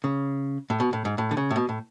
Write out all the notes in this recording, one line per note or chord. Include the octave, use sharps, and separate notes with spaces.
C#3
A2
B2
A2
G#2
A2
D3
C#3
A2
B2
A2